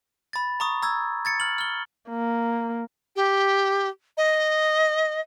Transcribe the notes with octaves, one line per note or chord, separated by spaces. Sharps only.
B5 A6
A#5 C#6 D#6
A#5 E6 G#6
G#6 A6 C#7
F6 F#7
F6 G7
A#3
G4
D#5